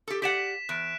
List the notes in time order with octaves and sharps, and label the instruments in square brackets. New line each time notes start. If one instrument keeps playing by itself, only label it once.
[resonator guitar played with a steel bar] G4 A4
[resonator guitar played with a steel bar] G4 D5 F#5 [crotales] B6 E7
[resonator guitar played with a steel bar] E2 [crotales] F#6 D7